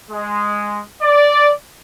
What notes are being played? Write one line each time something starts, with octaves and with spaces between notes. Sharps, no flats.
G#3
D5